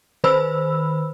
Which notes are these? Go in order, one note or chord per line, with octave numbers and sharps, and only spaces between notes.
D#3 B4 C5 B5 E6